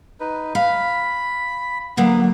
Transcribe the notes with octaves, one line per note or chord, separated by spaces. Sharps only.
D#4 B4
F5 B5
D3 F#3 A#3 B3